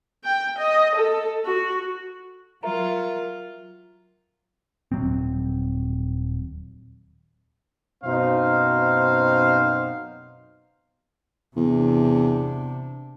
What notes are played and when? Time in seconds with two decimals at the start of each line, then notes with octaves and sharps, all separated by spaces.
0.24 G5
0.58 D#5
0.95 A4
1.46 F#4
2.63 F#3 F4 A#4 E5 A#5
4.92 D#1 F#3 C4
8.03 F#2 B2 C4 D#4 C5 F5
11.56 E2 C3 D4